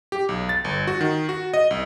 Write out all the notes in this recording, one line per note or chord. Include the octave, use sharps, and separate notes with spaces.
G4
B1
A6
G1
F#4
D#3
F#4
D#5
C2